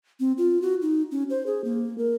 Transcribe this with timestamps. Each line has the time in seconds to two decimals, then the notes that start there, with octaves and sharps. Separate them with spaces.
0.20 C4
0.38 F4
0.62 F#4
0.82 D#4
1.11 C#4
1.30 C5
1.46 G#4
1.64 A#3
1.98 A#4